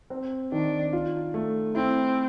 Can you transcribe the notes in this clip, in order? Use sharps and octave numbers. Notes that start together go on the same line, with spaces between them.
C4
D#3 D4
F4
A3
C4 E4